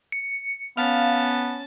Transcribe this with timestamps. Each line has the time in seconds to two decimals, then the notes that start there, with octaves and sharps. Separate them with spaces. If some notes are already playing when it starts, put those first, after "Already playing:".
0.12 C#7
0.77 B3 C#4 F5 A5